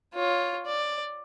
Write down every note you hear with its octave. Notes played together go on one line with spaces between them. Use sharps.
F4 C#5
D5